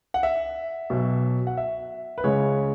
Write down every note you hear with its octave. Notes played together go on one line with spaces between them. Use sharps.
F#5
E5
B1 B2 F#3
F#5
E5
B4
C#2 C#3 G#3 C#5